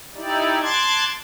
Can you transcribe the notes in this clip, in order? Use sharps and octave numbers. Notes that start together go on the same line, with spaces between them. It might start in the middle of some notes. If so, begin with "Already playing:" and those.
D#4 E4 G4 D5
A5 C6 D6 F#6 G#6 A6